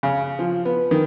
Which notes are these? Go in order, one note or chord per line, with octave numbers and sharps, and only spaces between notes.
C#3
F3
B3
D#3